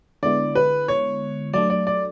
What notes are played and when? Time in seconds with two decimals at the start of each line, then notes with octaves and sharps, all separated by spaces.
0.23 D3 G#3 B3 E4 D5
0.55 B4
0.88 C#5
1.53 F#3 A3 D4 D5
1.70 D5
1.87 D5